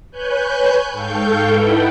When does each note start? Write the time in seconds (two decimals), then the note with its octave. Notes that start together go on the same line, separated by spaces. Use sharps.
0.11 B4 C#5 G#5 F#6 G6
0.91 G#2 A4 F5 G5 C#6 G6
1.50 D#4 E4 A4 B4 F#5 G5